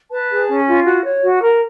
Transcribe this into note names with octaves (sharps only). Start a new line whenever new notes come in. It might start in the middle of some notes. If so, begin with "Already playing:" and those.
B4 A5
G#4
C#4
F4
F#4
C#5
F#4
A#4